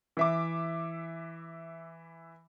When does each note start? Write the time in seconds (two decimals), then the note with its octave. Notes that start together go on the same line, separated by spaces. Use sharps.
0.17 E3 E5 D6